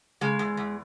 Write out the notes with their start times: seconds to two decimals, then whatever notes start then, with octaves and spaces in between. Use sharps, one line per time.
0.21 C#3 G#3
0.39 E2
0.57 E2